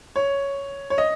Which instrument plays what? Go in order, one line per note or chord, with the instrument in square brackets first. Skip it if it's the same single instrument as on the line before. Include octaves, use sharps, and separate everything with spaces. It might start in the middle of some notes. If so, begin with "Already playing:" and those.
[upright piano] C#5
C#5
D#5